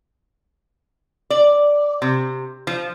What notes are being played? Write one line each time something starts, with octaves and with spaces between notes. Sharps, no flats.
D5
C3
F3